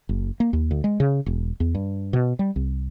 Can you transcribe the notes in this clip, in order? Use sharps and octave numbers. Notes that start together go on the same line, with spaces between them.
F#1
A#3
D#2
D2
G#3
C#3
E1
E2
G2
B2
G3
C2